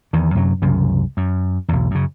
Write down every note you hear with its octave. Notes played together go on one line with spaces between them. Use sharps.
E2 D#3
F#2 C3 F#3
C2 F#2 C#3
F#2
B1 E2
F#2 C#3